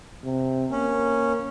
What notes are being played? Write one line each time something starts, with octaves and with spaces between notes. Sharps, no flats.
C3
A#3 C#4